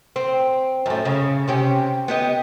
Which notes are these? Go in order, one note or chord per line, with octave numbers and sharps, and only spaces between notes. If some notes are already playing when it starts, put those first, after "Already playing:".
C4
F#2 A2
C#3
C3 C#4 G4
B3 G4 D#5